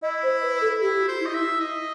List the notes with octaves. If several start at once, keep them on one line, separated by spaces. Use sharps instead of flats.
E4 D#5
C5
B4
A4
E4 G4
F#4
C5
E4
D#5
E5
E4
D#5